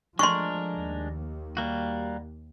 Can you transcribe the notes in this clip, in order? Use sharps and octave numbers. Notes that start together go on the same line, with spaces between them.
F3 G#3 A3 D4 A#4 C6 C#6
D#2
G3 A#3 F#4